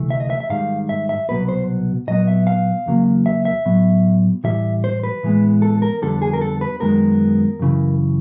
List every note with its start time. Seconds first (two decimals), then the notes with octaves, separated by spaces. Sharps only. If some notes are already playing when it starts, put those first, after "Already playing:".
Already playing: D2 C3 E3 A3
0.10 E5
0.20 D#5
0.30 E5
0.40 E5
0.49 G#2 D#3 G3 F5
0.89 E5
1.09 E5
1.28 C2 B2 F#3 B3 B4
1.49 C5
2.07 A#2 F#3 B3 D#5
2.28 E5
2.47 F5
2.86 E2 C#3 F#3 A#3
3.26 E5
3.45 E5
3.65 A2 F#3 B3
4.44 A2 E3 G3 E5
4.84 C5
5.03 B4
5.23 A2 E3 G#3 B3
5.62 A4
5.82 A#4
6.02 F2 D3 G3 B3 A4
6.22 G#4
6.33 A#4
6.41 A4
6.61 B4
6.80 F#2 D#3 G#3 B3 A#4
7.59 F#2 C#3 E3